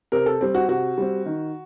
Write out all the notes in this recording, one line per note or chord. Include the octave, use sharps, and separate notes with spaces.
C3 A#4
A4
G3 C4
F#4
C3 F#4
G3 C4
D#3